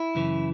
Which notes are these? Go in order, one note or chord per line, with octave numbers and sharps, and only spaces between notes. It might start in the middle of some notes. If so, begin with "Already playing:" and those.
Already playing: E4
F#2 C#3 E3